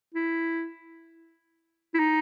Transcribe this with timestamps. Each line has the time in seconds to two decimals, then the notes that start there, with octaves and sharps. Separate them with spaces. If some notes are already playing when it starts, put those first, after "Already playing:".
0.14 E4
1.94 E4
1.99 D#4